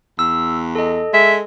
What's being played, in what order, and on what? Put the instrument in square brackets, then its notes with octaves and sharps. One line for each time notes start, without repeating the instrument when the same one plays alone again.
[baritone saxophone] E2 [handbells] E6
[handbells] A4 D#5
[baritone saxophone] G#3 [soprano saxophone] E5